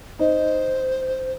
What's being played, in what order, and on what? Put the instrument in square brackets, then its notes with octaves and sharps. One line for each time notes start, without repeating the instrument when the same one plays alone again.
[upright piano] D#4 [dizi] C5